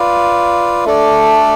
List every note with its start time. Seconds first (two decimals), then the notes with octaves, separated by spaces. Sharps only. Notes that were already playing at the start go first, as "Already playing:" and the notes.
Already playing: F4 B4 D5 F5
0.85 A3 D4 A4 D5